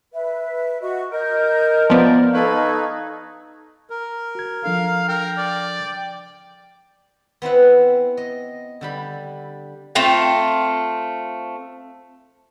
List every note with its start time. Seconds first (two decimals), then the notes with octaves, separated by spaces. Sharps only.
0.13 B4 E5
0.82 F#4 D#5 C#6
1.12 A#4 D#5 F6 G6
1.90 F3 B3 F4 A#4 D5
2.33 D#4 A4 B4 F5 C#6 G#6
3.90 A#4
4.35 F#4 G#6
4.64 F3 D4 A4 F5
5.08 A#4 G5
5.37 D5
7.42 B3 C4 E4 B4
8.17 D#5
8.81 D3 G3 B5
9.95 A3 C4 F4 G5